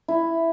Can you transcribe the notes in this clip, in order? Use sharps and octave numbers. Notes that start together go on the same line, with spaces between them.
E4